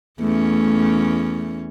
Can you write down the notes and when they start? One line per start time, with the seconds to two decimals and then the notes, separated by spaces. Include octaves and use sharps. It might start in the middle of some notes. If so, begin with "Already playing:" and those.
0.20 E2 A3 C#4